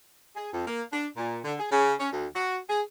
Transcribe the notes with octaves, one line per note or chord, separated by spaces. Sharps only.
G#4
F2
A#3
D4
A#2
D3
G#4
C#3
C#4
D2
F#4
G#4